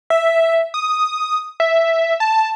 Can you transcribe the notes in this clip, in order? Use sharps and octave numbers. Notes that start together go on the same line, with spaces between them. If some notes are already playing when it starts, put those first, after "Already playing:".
E5
D#6
E5
A5